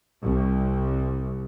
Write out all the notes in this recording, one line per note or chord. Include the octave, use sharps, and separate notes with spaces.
C2